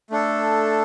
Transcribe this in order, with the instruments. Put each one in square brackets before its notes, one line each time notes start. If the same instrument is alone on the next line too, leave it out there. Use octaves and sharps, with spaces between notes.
[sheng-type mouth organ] A3 D4 A4